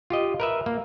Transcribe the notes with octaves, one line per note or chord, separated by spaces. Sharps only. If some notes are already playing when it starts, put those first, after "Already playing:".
F4 G4 D#5
A#4 B4 E5
A#3